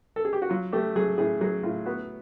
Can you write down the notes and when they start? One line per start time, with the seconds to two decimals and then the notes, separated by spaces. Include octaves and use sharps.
0.16 A4
0.25 G#4
0.33 G4
0.42 F#4
0.50 F#3 F4
0.73 A3 G4
0.96 F#3 G#4
1.18 A2 G#4
1.41 F#3 G#4
1.63 A2 F4
1.86 B3 F#4